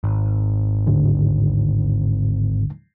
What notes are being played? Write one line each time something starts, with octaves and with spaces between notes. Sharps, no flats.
G#1
D#2 A2 D3